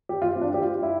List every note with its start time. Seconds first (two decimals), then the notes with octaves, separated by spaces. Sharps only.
0.09 G4
0.22 F4
0.35 C4
0.41 D4
0.54 G4
0.62 F4
0.83 E4